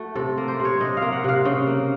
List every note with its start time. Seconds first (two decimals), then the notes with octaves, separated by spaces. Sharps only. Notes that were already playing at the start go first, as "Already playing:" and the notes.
Already playing: A3 F#4
0.15 C3 A4
0.38 A#3
0.48 C5
0.60 C3
0.65 C#5
0.81 C3 D#5
0.97 A#3 F5
1.13 F#5
1.24 C3 F5
1.45 C#3
1.67 A#3